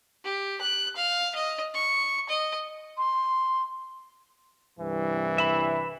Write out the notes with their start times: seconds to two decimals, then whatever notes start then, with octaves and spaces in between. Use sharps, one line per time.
0.24 G4
0.61 F#6
0.96 F5
1.35 D#5
1.74 C#6
2.29 D#5
2.97 C6
4.79 C2 G2 E3
5.38 E5 B5